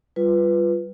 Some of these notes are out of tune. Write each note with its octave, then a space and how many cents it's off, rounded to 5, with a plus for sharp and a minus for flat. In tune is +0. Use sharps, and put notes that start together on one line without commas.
G3 -10 F4 +0 B4 +5